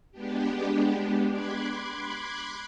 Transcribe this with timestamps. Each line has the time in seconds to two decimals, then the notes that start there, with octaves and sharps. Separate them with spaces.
0.12 G#3 B3 D4 G4
1.31 B5 C6 D6 F#6 G#6